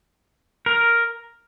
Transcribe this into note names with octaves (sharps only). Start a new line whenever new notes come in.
A#4